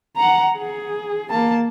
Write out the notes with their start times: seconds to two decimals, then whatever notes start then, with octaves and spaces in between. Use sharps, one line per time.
0.17 F#5 A#5
0.58 G#4
1.30 A#3 A5